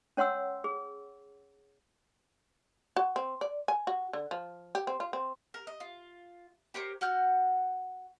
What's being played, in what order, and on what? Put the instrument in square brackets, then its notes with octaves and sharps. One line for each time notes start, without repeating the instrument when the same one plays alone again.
[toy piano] C#4 C#5 F#5 C6 E6
G#4
[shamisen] F#4
C4
D5
G#5
F#4
D3
F3
G4
C4
F4
C4
[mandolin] A#4
D#5
F4
G4 A#4 C5 C#5
F#4 F#5 F6 G6